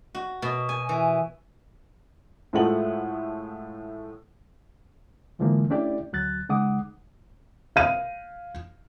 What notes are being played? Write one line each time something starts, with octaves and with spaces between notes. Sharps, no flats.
F#4
B2
G#5
E3
A2 F3 G#3 A3 F#5 F#7
G#2 D3 E3 F3 G#3 A#3
A3 C#4 D4 E4 G4 D5
D2 F#3 F#6 A6
C#3 G#3 D#4 F#5 D6 D#6
F5 D#7